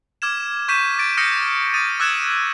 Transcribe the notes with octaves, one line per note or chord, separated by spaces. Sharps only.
D6 F6 G#6 E7
C#6 G6 B6 D#7 E7
D6 A6 D7
D#6 F6 G6 A#6 C#7
D#6 A6 D#7
D6 E6 F#6 G#6 A6 E7